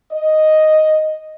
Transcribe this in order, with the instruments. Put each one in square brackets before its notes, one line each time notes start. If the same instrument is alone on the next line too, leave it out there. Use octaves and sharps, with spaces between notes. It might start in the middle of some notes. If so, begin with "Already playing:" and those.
[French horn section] D#5